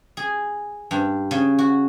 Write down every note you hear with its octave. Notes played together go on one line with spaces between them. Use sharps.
G#4
G2
C#3
F#4